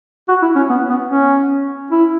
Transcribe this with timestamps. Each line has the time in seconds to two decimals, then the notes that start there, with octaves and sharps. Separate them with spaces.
0.29 F#4
0.42 E4
0.56 C#4
0.70 B3
0.89 B3
1.10 C#4
1.91 E4